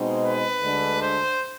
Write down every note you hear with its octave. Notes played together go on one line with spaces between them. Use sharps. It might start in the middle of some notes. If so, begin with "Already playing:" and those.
Already playing: B2 G#3 C4 D#4
B4
D2 D3 G#3 D4
C5